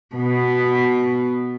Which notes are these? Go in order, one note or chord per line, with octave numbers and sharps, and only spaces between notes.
B2 B3